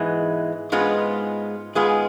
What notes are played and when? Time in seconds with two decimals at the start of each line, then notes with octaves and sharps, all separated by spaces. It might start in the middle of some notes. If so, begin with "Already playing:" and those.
Already playing: G#2 E3 G#3 B3
0.72 G#2 G#3 B3 F4
1.75 G#2 G#3 B3 F4 G#4